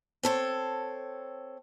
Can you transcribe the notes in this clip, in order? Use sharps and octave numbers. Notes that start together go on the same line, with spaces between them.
C4 A4 C#5